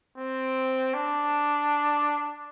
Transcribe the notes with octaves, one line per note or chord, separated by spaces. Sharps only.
C4
D4